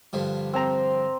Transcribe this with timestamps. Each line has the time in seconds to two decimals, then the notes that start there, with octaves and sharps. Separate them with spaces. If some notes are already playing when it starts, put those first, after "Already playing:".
0.13 G2 D3 F3
0.53 C4 C5 A#5